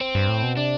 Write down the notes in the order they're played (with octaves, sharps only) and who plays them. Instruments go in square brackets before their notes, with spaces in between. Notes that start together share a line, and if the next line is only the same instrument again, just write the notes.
[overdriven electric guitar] C4
[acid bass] G2
A2
B2
[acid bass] C3 [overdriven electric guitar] D4